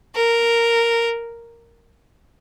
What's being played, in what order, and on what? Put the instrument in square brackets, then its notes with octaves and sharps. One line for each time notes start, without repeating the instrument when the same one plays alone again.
[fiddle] A#4